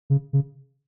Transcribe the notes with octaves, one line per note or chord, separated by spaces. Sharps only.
C#3
C#3